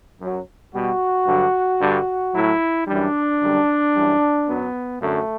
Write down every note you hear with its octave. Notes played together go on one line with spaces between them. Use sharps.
F#2 F#3
B2 G3 F#4
G2 D3 F#3
G2 D3 G3
A2 F#3 E4
F#2 E3 G3 D4
F#2 D3 G3
F#2 E3 G3
F#2 F#3 B3
F#2 D3 F#3 A3